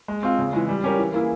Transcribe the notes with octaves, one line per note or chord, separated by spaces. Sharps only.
G#3
C4 F4
C#3
E3 G#3
G3
C#4 G4 A#4
E3
A#3 E4 G#4